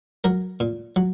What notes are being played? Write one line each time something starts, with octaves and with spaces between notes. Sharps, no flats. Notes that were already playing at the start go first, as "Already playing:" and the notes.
F#3 A#4
A#2
F#3